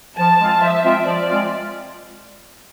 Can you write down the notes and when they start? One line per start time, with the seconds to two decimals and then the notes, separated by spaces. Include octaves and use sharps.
0.17 F3 A5
0.39 G#3 C4 F4
0.61 F3 E5
0.84 G#3 C4 F4
1.06 F3 D5
1.29 G#3 C4 F4